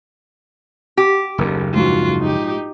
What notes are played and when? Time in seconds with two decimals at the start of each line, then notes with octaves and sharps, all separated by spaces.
0.97 G4
1.38 F#1 D#2 A4 A#4
1.74 A#1 G#2 F3 F4 F#4
2.20 D#4 G4